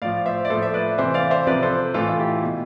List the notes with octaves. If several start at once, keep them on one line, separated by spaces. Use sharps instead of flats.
A2 F3 D5 F5
C5 E5
D5
A2 F3 A4 C5
E5
B4 D5
C3 E3 C5 E5
D5 F5
C5 E5
C3 F3 B4 D5
A4 C5
A2 E3 F4 A4
F4
E4 G4
B2